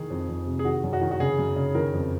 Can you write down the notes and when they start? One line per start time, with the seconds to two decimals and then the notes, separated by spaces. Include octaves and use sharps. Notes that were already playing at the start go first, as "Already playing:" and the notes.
Already playing: D#3 G#4
0.10 F2
0.29 F2
0.47 C3
0.59 G#4
0.65 D#3 F#4
0.84 F#2
0.93 F#4
1.01 D#3
1.11 F#4
1.20 C#3 G#4
1.38 F#2
1.56 C#3
1.75 D#3 A#4
1.93 F2